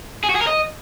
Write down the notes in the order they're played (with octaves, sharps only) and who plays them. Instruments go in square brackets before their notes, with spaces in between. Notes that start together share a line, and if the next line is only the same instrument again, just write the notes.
[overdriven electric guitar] G#4
F#4
G#4
A#4
D#5